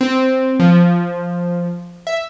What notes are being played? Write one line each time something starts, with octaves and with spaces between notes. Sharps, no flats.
C4
F3
E5